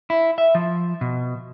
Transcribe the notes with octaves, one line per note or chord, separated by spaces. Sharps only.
E4
E5
F3
B2